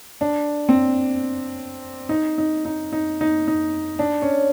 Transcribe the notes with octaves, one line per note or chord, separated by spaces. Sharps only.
D4
C4
D#4
D#4
D#4
D#4
D#4
D#4
D4
C#4